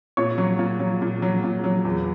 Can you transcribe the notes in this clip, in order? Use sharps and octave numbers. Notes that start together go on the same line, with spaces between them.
A#2 C#5 C#6
F#3
A#2
F#3
A#2
F#3
A#2
F#3
E2